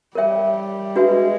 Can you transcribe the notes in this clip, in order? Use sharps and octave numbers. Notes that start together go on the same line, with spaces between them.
G3 A#4 C#5 E5 G5
G#3 D4 F#4 B4 E5